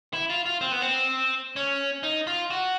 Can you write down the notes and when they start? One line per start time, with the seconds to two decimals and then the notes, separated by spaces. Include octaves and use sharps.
0.13 E4
0.30 F4
0.46 F4
0.61 C4
0.72 B3
0.82 C4
1.56 C#4
2.03 D#4
2.27 F4
2.50 F#4